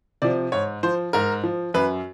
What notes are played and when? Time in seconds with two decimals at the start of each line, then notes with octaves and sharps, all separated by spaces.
0.22 C3 F3 D5
0.52 G#2 C#5
0.83 F3 C5
1.13 G#2 A#4
1.43 F3
1.74 F#2 B4